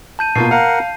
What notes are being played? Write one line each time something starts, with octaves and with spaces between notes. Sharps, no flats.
A5 G6 D#7
B2 A#3 F4 C7
A#4 F5 F#5